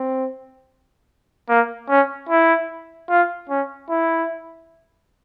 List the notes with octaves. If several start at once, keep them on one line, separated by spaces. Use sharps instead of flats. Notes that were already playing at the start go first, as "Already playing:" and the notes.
Already playing: C4
A#3
C#4
E4
F4
C#4
E4